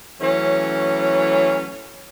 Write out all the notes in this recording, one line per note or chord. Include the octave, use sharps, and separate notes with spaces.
E3 F#3 A3 C#4